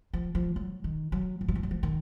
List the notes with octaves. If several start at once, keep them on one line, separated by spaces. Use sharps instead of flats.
F3
F3
F#3
D#3
F#3
F3
F#3
F3
F#3
F3
D#3